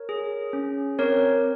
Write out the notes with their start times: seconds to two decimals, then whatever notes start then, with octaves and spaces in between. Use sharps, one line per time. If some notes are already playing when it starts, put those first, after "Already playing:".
Already playing: A#4 C#5
0.09 G#4
0.53 C#4
0.99 C4 A#4 C#5